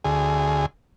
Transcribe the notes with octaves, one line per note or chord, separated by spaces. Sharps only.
D2 G#4